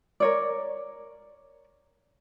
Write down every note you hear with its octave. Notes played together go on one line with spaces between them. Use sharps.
A#4 C#5 D5